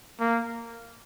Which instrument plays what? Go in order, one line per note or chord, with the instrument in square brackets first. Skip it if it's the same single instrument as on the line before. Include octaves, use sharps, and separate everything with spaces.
[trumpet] A#3